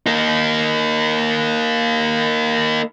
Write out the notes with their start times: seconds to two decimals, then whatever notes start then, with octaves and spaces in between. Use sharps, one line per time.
0.06 A#3 D#4